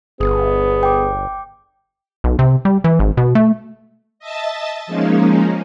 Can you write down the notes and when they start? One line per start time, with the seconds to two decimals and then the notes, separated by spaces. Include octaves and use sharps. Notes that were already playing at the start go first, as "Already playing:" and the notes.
0.20 G1 B3 G#4
0.83 G5 D6
2.24 B1
2.39 C3
2.65 G3
2.84 E3
2.99 G#1
3.17 B2
3.35 A3
4.19 D#5 E5 A5 A6
4.87 F3 G#3 A#3 C#4 D#4